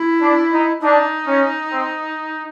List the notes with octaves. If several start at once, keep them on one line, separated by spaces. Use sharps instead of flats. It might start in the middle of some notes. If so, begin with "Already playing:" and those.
Already playing: E4
D4
D#4
D4 D#4
C#4
C4